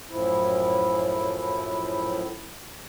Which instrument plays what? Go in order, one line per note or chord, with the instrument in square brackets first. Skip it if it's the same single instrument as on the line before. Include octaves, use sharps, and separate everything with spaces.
[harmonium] F#2 A2 F3 E4